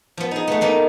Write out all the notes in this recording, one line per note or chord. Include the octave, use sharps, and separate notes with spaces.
F3 B3
D#4 G#4
A3 B3
A#3 B3 D#4